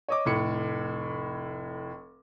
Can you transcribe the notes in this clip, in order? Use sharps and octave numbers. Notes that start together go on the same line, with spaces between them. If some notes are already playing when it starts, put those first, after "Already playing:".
C#5 D#5 D6
F1 A2 C#7